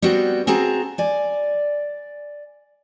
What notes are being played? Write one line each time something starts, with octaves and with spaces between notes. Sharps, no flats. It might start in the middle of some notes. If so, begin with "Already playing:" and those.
G3 B3 C4 F#4
C4 F#4 G#4 A5 A#5
D5 G#5